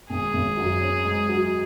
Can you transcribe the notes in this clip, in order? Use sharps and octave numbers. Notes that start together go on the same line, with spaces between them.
G#1 G#4
G#1
F#2
C#4
G#2
F#3